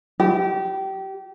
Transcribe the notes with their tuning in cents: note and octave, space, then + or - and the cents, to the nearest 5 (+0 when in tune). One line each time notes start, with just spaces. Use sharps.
G4 -25